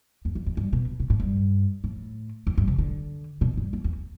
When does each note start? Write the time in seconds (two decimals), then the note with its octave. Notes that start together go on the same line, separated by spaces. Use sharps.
0.25 F2
0.35 E2
0.46 F2
0.57 G2
0.73 B2
1.00 B2
1.10 A2
1.20 G2
1.84 A2
2.47 F2
2.58 G2
2.68 C3
2.79 D3
3.41 B2
3.57 G2
3.73 F2
3.84 E2